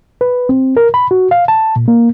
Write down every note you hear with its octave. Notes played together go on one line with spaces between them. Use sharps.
B4
C4
A#4
B5
F#4
F5
A5
A#2
A#3